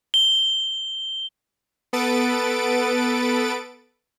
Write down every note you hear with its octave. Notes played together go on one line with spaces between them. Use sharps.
G7
B3 A4 B4 A6 D7